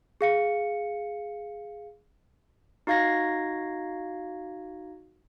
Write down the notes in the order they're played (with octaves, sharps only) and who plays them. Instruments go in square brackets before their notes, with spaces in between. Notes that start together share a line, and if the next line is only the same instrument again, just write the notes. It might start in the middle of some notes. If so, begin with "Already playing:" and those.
[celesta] G#4 F5 C#7
[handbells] D#4 F#4 F5 G#6 A#6